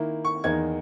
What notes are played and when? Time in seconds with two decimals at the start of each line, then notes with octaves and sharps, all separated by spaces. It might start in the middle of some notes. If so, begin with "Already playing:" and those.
Already playing: D#3 A#3 E4
0.25 C#6
0.44 E2 D#3 A#3 D#4 G#6